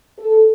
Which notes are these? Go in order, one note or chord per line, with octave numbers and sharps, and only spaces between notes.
A4